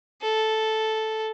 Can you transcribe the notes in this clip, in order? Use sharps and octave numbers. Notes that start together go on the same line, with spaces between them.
A4